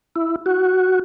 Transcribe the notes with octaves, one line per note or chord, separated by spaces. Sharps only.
E4
F#4